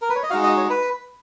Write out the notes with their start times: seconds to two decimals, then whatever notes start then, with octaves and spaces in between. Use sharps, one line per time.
0.02 A#4
0.09 B4
0.16 C#5
0.23 D#5
0.30 G#3 D#4 F#4 F5
0.43 D#5
0.57 C#5
0.70 B4